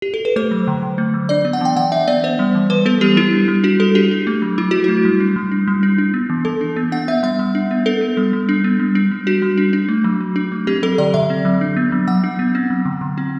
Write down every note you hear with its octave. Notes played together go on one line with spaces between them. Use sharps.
G4
A4
B4
A3 C5
F#3
D3
D3
A3
F#3
D4 D5
B3
F#5
E3 G5
E3 F#5
D4 E5
B3 D5
B3 C5
G3
E3
E3 B4
B3 A4
G3 G4
G3 E4
D4
G3
D4 F#4
G3 A4
D4 G4
D4
A3
F#3
F#3 E4
D4 F#4
A3 E4
G3
D4
G3
D4
G3
D4
D4
B3
E3
E3 A4
D4
B3
D4 F#5
B3 E5
G3 E5
G3
D4
B3
D4 A4
B3
G3
G3
D4
B3
G3
D4
G3
D4 F#4
G3
D4
D4
A3
F#3
F#3
D4
A3
C4 G4
F#3 A4
D3 D5
D3 E5
C4
F#3
D4
B3
F#3
F#3 F#5
D4
B3
C4
F#3
D3
D3
C4